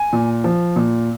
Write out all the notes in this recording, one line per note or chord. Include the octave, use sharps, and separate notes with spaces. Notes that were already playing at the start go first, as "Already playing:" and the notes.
Already playing: G#5
A#2
F3
A#2